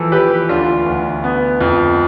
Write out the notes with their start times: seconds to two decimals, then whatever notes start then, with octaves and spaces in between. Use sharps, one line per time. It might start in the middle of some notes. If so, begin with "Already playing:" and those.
Already playing: E3 F3 A4
0.12 E3 G4 B4
0.49 D2 D4 F4
0.86 D2
1.24 B3
1.61 F2